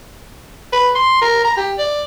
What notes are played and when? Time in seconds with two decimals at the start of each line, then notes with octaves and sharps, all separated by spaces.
0.72 B4
0.95 C6
1.21 A#4
1.44 A#5
1.57 G4
1.78 D5